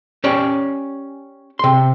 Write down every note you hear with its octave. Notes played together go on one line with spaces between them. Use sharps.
C#4 G4 C#5 D5
C3 C6